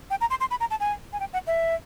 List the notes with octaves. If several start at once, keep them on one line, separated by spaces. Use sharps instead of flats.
G5
A#5
C6
C6
B5
A#5
A5
G#5
G#5
G5
F#5
E5